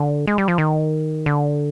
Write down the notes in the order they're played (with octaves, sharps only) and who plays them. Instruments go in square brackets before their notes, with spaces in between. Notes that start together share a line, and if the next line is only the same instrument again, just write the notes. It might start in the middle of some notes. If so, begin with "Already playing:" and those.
Already playing: [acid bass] D3
G#3
G3
F3
D#3
D3